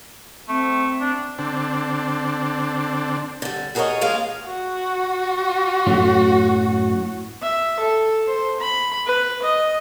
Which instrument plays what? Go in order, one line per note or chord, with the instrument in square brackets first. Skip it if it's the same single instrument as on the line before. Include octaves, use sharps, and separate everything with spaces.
[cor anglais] A3 [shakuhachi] C4
[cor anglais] D4
[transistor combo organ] D3 C4 D4
[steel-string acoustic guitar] D3 G3
F#4 G#4 A#4 B4 C#5 D#5
F2 G#3 A#3 G#4 F5
[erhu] F#4
[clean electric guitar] F#2 A2 F#3
[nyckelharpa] E5
A4
C5
B5
B4
D#5